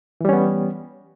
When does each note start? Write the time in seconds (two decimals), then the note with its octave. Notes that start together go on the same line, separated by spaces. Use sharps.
0.21 E3
0.25 G3
0.29 C#4
0.33 B3